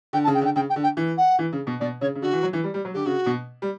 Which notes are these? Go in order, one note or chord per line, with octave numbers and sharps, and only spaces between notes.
D3 G5
A5
C#3
G5
D3
G5
C#3 G5
G5
D3
G5
E3
F#5
E3
C#3
B2
B2 D5
C#3 C#5
C#3
D3 F#4
E3
F#3
E3
G3
G3
F#3
D3 G4
C#3 F#4
B2
G3